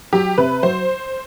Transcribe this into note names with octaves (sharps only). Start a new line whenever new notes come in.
F#3 G4
C3 B4
F#3 C5